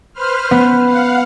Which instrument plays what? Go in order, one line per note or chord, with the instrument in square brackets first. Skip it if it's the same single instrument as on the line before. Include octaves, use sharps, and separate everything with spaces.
[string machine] B4 C5 F6
[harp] B3
[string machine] F5 F#5